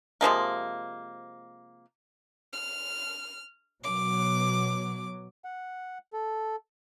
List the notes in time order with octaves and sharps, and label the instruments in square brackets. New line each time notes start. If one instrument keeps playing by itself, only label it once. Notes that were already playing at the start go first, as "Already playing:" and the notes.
[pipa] C3 F3 G#3 A#3
[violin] F6
[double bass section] B2 F#3 [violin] D6
[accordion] F#5
A4